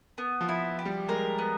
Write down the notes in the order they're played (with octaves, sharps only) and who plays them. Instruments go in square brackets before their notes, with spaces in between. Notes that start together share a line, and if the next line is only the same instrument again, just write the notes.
[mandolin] B3
[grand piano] F3
[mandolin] E4
G4
[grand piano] G3
[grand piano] G#3 [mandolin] A#4
[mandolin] B3